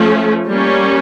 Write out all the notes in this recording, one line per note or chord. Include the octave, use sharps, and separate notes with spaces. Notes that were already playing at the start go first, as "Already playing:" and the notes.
Already playing: F3 A3 C#4
G3 A#3 C#4